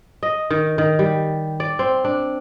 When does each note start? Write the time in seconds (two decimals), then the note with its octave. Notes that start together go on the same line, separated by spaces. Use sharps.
0.23 D#5
0.50 D#3
0.78 D#3
0.99 G3
1.60 D5
1.79 C4
2.05 D4